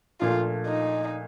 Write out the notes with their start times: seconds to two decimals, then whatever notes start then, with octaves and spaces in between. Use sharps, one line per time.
0.20 A#1 A#2 A3 F4
0.67 D#4